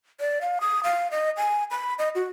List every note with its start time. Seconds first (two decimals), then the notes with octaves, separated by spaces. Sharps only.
0.20 D5
0.41 F5
0.61 D#6
0.84 F5
1.11 D#5
1.37 G#5
1.71 B5
1.99 D#5
2.15 F#4